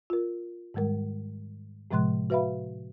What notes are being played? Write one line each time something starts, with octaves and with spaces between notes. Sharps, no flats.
F4 A#4
G#2 D#3 G3 G#3 A#4
A2 C3 F3 G#3 C6 F#6
F#4 B4 E5 F5 B5